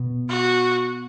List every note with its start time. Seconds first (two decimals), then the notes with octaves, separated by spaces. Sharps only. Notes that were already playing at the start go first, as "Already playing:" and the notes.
Already playing: B2
0.29 F#4